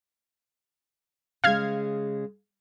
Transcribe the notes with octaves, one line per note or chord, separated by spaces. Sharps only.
C#3 G#3 F5 F6 G#6